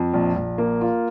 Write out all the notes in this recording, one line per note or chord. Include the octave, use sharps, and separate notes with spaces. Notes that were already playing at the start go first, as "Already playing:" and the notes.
Already playing: F2
A#1
A#1
A#3
F4